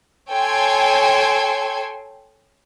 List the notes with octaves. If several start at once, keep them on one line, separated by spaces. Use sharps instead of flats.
A4 C#5 G5 G#5 C6 G#6